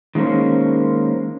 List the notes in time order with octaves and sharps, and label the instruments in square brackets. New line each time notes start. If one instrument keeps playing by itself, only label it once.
[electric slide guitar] D#3 G#3 A#3 C#4 C5